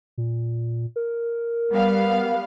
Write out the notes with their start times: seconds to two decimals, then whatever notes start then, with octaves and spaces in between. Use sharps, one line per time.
0.18 A#2
0.96 A#4
1.72 G3 B3 F5